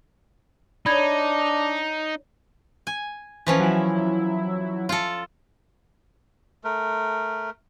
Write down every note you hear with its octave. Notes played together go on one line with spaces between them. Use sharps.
D4 D#4 C#5 D5 B5 G#6
G#5
E3 F3 C#4
F#3 E4
F4 A4
A3 A#4